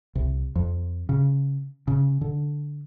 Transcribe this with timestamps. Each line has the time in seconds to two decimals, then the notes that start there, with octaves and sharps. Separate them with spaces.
0.15 C2
0.56 F2
1.09 C#3
1.88 C#3
2.21 D3